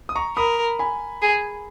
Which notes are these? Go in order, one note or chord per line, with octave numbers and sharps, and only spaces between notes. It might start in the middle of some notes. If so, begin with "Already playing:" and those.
D#6
A#5 C#6
A#4 B5 D#6
G#5 B5
G#4